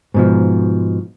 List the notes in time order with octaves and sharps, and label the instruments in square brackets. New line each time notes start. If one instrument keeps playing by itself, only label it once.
[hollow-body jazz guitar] G#2 B2 F3